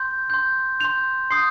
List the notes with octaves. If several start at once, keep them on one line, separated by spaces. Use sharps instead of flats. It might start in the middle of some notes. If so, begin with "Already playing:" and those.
Already playing: C6 G6
C6 G6
C6 G6 F7
C6 D#6 G6 C7